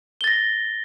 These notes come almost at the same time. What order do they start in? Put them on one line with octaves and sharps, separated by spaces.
G7 A6 A#6